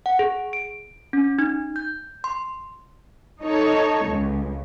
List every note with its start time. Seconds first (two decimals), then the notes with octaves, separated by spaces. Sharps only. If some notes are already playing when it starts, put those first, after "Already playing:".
0.06 F#5
0.19 G#4
0.53 D7
1.13 C#4
1.38 D#4
1.76 G6
2.24 C6
3.42 D#4 A4 C#5
4.07 C#2